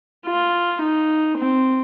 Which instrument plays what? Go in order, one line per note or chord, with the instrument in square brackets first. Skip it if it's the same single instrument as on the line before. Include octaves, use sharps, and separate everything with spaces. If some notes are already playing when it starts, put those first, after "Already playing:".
[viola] F4
D#4
C4